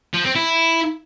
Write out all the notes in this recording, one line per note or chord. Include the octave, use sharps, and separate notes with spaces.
F3
C4
E4